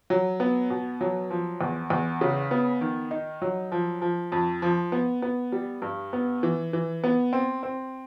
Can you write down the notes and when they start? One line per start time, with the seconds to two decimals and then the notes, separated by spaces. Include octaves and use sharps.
0.10 F#3
0.40 B3
0.70 B2
1.01 F#3
1.30 F3
1.61 E2
1.90 E2
2.21 C#3
2.51 B3
2.81 D#3
3.11 D#4
3.42 F#3
3.72 F3
4.02 F3
4.32 F2
4.62 F3
4.92 B3
5.22 B3
5.52 G3
5.82 G2
6.13 B3
6.43 E3
6.73 E3
7.04 B3
7.33 C4
7.63 C4